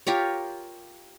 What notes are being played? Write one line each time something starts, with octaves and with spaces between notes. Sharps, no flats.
F4 G4 A#4 C#5